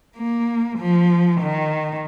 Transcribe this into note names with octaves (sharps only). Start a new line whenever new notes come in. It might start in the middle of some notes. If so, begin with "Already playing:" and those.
A#3
F3
D#3